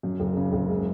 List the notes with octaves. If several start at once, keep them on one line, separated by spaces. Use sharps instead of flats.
F#2
F#1
C#3
F#1
G#3